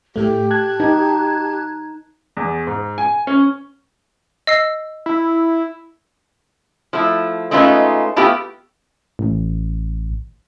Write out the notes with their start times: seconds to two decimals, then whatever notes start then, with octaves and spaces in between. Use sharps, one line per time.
0.16 A2 A3 G4
0.50 A5 F#6 G#6
0.80 D#4
2.37 E2
2.67 G#2
2.98 G#5
3.27 C#4
4.47 D#5 E6 C7
5.06 E4
6.93 F3 A3 E4
7.51 G#3 A3 C#4 D#4 F4 B4
8.16 A3 B3 E4 F4 G4
9.19 A1